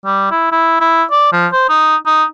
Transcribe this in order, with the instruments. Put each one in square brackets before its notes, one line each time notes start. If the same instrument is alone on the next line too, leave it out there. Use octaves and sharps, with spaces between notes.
[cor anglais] G3
E4
E4
E4
D5
F3
C5
D#4
D#4